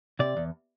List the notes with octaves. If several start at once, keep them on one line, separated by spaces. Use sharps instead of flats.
C3 D5
E2